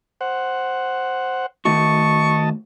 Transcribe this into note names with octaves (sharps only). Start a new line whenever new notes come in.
C5 F#5
D#3 A3 F#4 D#5 A5 C#6